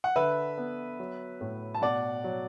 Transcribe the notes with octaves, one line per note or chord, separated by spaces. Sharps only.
F#5
D3 B4 E5
B3
F#3
A2
A5
B2 D5 F#5
F#3